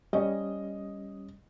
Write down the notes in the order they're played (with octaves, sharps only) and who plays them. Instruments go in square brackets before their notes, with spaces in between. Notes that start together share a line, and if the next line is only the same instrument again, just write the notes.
[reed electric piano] G3 C#4 [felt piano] D#5